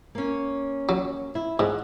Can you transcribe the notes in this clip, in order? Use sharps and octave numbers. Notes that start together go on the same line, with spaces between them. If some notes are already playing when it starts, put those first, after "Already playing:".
A#3 C#4
F#3
E4
G#2 F#5